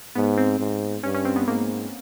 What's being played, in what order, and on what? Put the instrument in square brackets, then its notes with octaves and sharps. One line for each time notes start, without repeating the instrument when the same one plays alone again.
[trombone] G#2 [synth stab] B3
[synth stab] C4
[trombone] G#2
[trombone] G2 [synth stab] C#4
[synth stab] C#4
C4
B3
[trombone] G#2 [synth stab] A#3